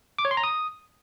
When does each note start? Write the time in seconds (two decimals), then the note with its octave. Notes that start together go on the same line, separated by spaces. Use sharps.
0.19 D6
0.25 C#5
0.31 C6
0.37 A#5
0.43 D#6